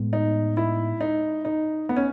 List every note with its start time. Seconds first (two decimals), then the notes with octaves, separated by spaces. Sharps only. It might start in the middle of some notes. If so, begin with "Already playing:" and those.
Already playing: A2 G#3 B3
0.13 D#4
0.57 E4
1.01 D#4
1.45 D#4
1.89 B3
1.96 C#4